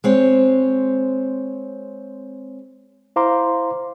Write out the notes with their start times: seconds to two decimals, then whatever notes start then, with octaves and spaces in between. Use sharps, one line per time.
0.04 G#3 C4 C#5
3.16 E4 C5 F5 A#5 C6 D6